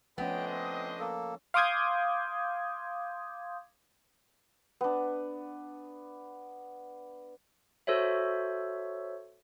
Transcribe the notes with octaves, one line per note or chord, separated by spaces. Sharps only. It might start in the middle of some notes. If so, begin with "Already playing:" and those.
F3 A3 B3 C#4 D4 C5 D#5 G5
C4
A#3 A4
F5 C6 D6 D#6 G6 G#6
B3 D4
F#4 A4 C5 C#5 E5